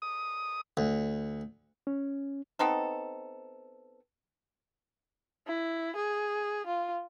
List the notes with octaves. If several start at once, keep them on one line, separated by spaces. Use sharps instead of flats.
D#6
D2
C#4
B3 C4 D#4 A4
E4
G#4
F4